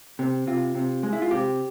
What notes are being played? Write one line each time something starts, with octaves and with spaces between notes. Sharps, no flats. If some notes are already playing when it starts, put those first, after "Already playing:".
C3
C3 F4
C3
G#3
E4
F4
C3 G4